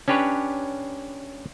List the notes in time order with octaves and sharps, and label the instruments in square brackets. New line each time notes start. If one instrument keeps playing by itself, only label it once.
[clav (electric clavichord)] C#4 D4 G4 B4 C#5